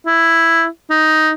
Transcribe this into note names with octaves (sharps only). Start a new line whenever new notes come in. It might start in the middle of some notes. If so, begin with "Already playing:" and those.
E4
D#4